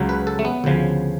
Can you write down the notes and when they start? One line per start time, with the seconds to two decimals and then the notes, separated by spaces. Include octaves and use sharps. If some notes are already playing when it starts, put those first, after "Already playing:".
Already playing: C#2 C#3 F#3
0.09 B4
0.27 A4
0.39 A3
0.45 B3
0.64 D2 C#3 F3